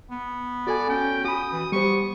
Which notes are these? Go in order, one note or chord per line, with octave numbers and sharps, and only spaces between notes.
B3
F#4 A4 D5 G#5
C#4 G5
F#4 B5 D#6
E3
G3 B3 G4 C5 C#6